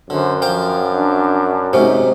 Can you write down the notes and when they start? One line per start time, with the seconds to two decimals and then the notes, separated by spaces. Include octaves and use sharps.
0.10 F#2 D3 C5
0.42 F3 C5 F5 G5
0.92 D4
1.73 G#2 C3 F#3 C#4 D#4